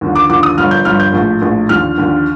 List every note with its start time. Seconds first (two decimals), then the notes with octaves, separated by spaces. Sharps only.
0.01 D#2 D3 F3
0.15 D6
0.29 D#2 D3 F3 D6
0.43 D#6
0.58 G1 G2 F3 F6
0.71 G6
0.85 G1 G2 F3 F6
1.00 G6
1.13 A#1 A2 F3
1.42 A#1 A2 F3
1.69 D#2 D3 F3 F6
1.98 D#2 D3 F3